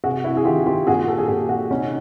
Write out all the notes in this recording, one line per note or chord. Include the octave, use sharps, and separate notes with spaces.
C3 F#4 G#4
E4 F#4
G#4
D#3 F4 G4
F4 G4
A#2 F#4 G#4
G4 A4
G#4
A#2 G4 A4
F#4 G#4
C3 C#4 D#4